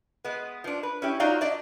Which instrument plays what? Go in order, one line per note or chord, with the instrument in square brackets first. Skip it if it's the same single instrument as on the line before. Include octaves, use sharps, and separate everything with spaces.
[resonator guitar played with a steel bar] G#3 B3
F3 D4
B4
C#4 E4 G4
F#3 D#4 F4 C#5 D5 F5
D4 D5 D#5